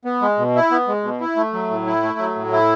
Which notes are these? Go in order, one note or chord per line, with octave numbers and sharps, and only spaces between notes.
B3
G#3
B2
E4
B3
G#3
B2
E4
A3
F#3
A2
E4
A3
F#3
A2
E4